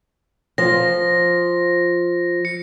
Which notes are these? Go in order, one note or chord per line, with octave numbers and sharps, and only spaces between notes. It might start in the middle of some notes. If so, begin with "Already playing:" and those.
F3 A#6
C#7